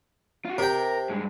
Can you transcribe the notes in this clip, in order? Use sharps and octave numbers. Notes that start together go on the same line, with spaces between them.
F4 F#4
C3 A#4 G5
G2 G#3